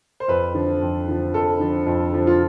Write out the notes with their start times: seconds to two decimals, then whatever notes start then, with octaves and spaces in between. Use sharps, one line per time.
0.20 C5
0.28 F2 B4
0.54 D3 F3
0.82 F2
1.08 D3 F3
1.34 F2 A4
1.60 D3 F3
1.87 F2
2.13 D3 F3
2.27 F4